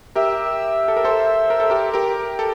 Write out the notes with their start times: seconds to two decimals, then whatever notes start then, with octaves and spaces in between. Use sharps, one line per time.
0.15 G4 A#4 E5
0.88 A4
0.97 A#4
1.04 A4 C5
1.50 A#4
1.60 A4
1.70 G4 A#4
1.94 G4 A#4
2.39 A4